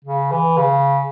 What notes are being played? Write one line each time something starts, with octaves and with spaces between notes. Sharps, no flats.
C#3
E3
C#3